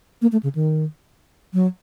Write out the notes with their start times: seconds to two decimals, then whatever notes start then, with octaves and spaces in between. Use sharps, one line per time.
0.22 A#3
0.32 A3
0.43 C#3
0.55 D#3
1.54 F#3